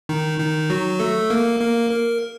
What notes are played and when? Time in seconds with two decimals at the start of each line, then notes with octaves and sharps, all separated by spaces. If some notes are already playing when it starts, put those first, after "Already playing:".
0.09 D#3 D#4
0.40 D#3 D#4
0.70 F#3 F#4
1.00 A3 A4
1.30 A#3 A#4
1.60 A#3 A#4
1.91 A#4